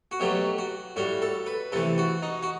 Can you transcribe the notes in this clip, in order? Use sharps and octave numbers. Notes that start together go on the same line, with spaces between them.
F#4
B2 F#3 A3 G4
F#4
A2 G3 F#4
A4
B4
C3 E3 A3 A4
F#4
D#4
F#4